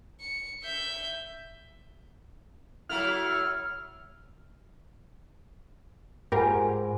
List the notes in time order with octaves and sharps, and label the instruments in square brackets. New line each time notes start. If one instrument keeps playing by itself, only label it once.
[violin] C#7
E5 G6
[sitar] F#3 A3 E4 [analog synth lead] F6
[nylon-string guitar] G#2 [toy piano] F4 F#5 G#5 [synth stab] G4 A#4